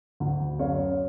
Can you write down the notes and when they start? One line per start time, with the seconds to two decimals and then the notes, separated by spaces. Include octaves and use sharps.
0.20 D2
0.59 F#2 C#5 F5